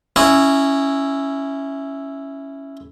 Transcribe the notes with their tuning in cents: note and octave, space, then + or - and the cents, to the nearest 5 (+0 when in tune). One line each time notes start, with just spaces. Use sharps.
C#4 +0 E4 +0 D#5 -25